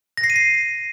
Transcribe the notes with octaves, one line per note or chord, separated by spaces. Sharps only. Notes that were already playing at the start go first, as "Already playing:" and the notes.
A#6
C7
D#7
C7